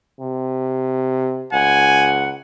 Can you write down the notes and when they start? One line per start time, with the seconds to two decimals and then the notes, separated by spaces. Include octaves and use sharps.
0.20 C3
1.53 C#2 F#5 G#5